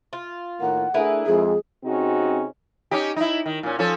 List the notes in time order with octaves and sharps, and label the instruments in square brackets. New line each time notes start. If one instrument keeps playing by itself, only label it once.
[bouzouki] F4
[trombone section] A2 D#3 A#3 [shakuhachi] F#5
[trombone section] A3 D4 G#4 [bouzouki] E4 A#4 B4
[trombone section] F2 G#3 [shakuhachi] G#4
[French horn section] C3 C4 C#4 D#4 F#4 G#4
[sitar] C#4 D#4 G4
D#4 E4
D#3
A#2 C#4
F3 C#4 A4